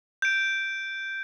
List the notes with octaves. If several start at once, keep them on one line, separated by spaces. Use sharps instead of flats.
G6 D7